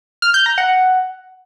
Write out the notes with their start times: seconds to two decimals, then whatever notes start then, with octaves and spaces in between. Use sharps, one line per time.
0.22 F6
0.34 G6
0.46 A#5
0.58 F#5